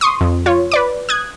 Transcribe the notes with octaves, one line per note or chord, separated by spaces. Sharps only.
C6 C#6 D#6
F2
F4 C#5
B4 D5 D6
D#6 F#6 G#6